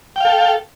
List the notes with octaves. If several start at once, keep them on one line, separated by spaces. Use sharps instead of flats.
A4 F5 G5